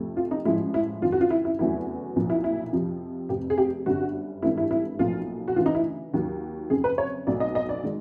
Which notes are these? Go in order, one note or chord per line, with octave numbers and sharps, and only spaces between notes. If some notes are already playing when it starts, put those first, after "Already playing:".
Already playing: F2 C3 F3 A3
F4
D#4
A1 A2 F3 G#3 E4
E4
F#1 F#2 D#3 F4
F#4
F4
E4
E4
F1 E2 C#3 F#3 A3 E4
B1 A#2 F3
E4
E4
F2 C3 F3
F1 F2 C3 G4
G#4
G4
G1 F#2 D3 G3 F#4
G#1 G2 E3 A3 E4
E4
E4
B1 A#2 F3 A3 F4
F#4
D2 C#3 E3 F4
D#4
E4
D#2 D#3 F#3
F#1 F2 C#3 G#4
B4
C#5
B1 B2 F#3 A3 D5
D#5
D#5
D5
D#3 G#3